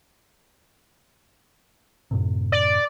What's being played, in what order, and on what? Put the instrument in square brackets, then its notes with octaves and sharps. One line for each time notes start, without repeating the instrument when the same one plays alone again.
[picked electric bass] F#2 A2 C3
[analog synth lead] D5